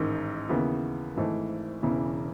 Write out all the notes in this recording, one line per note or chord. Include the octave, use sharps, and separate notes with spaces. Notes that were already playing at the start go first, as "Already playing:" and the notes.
Already playing: A1 G#2 D#3
D#2 C#3 E3 B3
G#1 G#2 E3 A3
E1 E2 C#3 E3